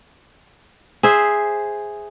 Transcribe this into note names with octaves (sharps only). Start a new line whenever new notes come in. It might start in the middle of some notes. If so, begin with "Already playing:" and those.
G#4 C5 E5